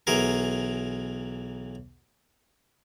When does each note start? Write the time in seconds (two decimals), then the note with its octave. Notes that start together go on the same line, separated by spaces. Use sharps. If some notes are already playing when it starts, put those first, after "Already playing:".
0.07 B1 E3 G#4 A#4